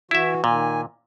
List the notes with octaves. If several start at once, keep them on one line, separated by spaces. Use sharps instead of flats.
E3 E4 F#4 E5
A#2 D#3 G#5